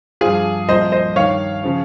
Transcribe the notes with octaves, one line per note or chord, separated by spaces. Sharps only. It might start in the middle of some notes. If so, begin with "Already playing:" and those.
G2 F3 F4 G#4
C2 A#2 F3 C5 D#5
C5 D#5
G2 D#3 C#5 F5
C#3 F3